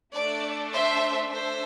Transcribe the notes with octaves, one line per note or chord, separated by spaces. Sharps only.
A3 D4 A4 D5
C5 E5
A3 D4 A4 C5 E5